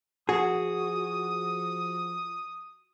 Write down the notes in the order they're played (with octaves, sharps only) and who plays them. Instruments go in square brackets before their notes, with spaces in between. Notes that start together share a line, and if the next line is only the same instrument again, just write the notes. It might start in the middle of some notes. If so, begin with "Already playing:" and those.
[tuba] F3 [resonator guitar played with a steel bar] F#4 [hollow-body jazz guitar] G#4 [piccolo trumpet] D#6